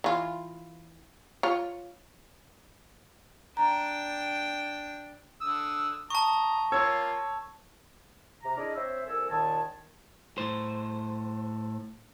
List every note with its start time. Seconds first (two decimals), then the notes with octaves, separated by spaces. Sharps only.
0.04 E3 F4
1.43 F4 C#5
3.57 D4 G5 A#5
5.41 D3 D#6 E6
6.10 A5 A#5 C#6 D#6
6.72 A#3 F4 C#5 E6 G#6
8.43 C3 A#5
8.57 D4 E4 G#4 A#4 D5 D#5
8.75 C4 C5 C#5 E5
9.06 C2 A4 A#4 G#5 E6
9.30 D#2 A#2 D#3 G#4 G#5 A5
10.38 A2 C5